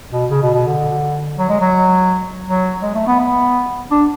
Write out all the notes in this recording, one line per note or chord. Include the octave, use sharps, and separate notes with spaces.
B2
C#3
B2
B2
D3
F#3
G#3
F#3
F#3
G#3
A3
B3
B3
D4